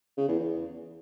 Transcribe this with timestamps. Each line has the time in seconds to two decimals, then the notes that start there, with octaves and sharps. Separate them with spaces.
0.17 C#3
0.28 E2
0.39 E2